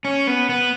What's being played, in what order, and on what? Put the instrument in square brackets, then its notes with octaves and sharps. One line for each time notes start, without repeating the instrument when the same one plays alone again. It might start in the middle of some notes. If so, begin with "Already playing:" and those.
[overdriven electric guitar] C#4
B3
B3